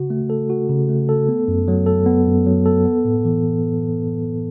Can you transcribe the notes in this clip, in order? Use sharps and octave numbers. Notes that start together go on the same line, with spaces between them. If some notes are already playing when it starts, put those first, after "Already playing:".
Already playing: C#3 F#4
A3
A4
F#4
C#3
A3
A4
B3
F#2
F#3
A4
B3
F#2
F#3
A4
B3
A2
E3